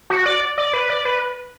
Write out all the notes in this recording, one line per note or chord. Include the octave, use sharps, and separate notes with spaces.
F#4
D5
D5
B4
D5
B4